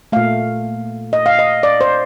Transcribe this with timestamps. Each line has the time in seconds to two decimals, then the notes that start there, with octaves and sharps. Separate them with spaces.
0.12 A#2 A3 F5
1.13 D#5
1.26 F5
1.39 D#5
1.63 D5
1.81 C5